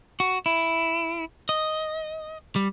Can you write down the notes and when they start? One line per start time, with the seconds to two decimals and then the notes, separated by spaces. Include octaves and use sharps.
0.20 F#4
0.46 E4
1.49 D#5
2.56 G3